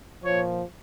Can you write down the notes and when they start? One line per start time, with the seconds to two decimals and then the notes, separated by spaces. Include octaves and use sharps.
0.23 A#2 F3 C#5